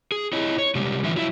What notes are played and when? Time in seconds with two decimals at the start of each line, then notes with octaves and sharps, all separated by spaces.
0.12 G#4
0.33 E4 C#5 D#5
0.58 C#5
0.75 C3 G3 G#3
1.04 D3 E3 F3 E5
1.16 F#3 E4 E5